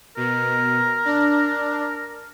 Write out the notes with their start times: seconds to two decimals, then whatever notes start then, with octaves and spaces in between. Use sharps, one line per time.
0.17 B2 A#4
1.05 D4